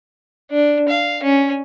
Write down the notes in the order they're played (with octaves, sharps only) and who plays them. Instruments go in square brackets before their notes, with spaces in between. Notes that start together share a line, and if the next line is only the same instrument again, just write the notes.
[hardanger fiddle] D4
F5
C#4